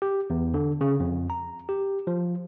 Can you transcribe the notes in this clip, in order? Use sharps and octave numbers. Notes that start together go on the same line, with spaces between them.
G4
E2
D3
C#3
F2
A#5
G4
F3